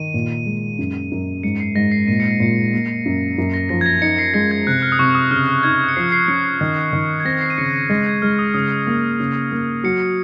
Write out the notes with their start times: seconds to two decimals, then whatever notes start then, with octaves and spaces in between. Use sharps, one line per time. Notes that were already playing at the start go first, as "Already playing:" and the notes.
Already playing: D#3 D#7
0.14 A#2
0.46 G#3
0.78 F#2
1.12 F#2
1.43 G#2 C#7
1.60 C7
1.75 G#2 A#6
1.92 C7
2.08 A#2 D#7
2.20 C#7
2.31 C7
2.40 A#2 C#7
2.73 A#3
3.06 F#2
3.38 F#2
3.54 A#6
3.69 F3 A#6
3.81 G#6
3.86 A#6
4.02 D#4 C#7
4.18 C7
4.34 G#3 A#6
4.51 G#6
4.67 C3 F#6
4.82 F6
4.92 D#6
4.99 C3 C#6
5.15 D#6
5.31 C#3 F6
5.63 D#4 G#6
5.89 C#7
5.96 F3 C7
6.12 C7
6.28 C#4 C#7
6.44 C7
6.61 D#3 G#6
6.93 D#3
7.20 G#6
7.25 C4 A#6
7.41 C7
7.50 D#7
7.58 C#3 C#7
7.74 C#7
7.89 G#3 A#6
8.06 G#6
8.22 G#3 F6
8.39 D#6
8.54 C#3 D#6
8.87 A#3
9.20 C#3
9.52 A#3
9.84 F#3 C#7